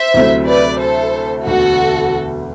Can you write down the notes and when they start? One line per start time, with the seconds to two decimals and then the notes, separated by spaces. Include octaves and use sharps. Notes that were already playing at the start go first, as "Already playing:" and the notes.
Already playing: C5 E5
0.14 D2 C3 F#3 A3 E4
0.48 B4 D5
0.79 A4 C5
1.45 E1 D2 D3 A3 F#4 A4